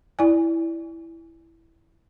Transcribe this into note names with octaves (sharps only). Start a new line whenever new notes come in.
E4 D5 G#5